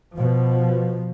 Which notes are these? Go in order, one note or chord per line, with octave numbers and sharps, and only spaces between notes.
B2 F3